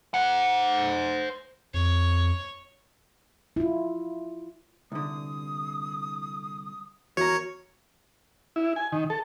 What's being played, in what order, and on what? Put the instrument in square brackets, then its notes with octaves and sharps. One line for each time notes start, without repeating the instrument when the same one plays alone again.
[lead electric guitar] C5 F#5
[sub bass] F2 [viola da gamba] C#5
[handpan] E4 F4
[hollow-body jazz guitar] C2 D3 [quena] D#6
[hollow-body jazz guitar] E2 A#5 [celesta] F#4 [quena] A#4 [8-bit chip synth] C#5
[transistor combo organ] E4
G#5
D#3
A4